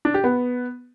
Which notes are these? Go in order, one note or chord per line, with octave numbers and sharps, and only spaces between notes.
D4
G4
B3